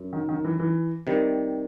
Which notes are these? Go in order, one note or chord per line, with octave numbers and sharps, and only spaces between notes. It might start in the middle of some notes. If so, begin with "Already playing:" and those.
Already playing: F#2
D#3
D#3
E3
E3
C3 D#3 G3